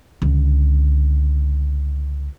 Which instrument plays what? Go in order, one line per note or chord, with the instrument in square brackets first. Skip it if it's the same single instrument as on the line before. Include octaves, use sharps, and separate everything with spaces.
[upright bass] C#2 D3